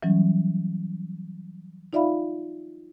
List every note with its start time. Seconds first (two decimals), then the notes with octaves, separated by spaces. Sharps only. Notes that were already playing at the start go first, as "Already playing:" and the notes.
0.03 E3 F#3 G3 C#4
1.93 D#4 F4 D5 E5 F5 B5